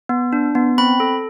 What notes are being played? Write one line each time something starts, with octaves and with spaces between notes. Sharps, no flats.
B3
D4
B3
C4 B5
A4